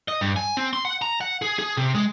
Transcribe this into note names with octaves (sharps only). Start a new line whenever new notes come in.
D#5
G2
G#5
C4
C6
F#5
A#5
F#5
G#4
G#4
C3
G#3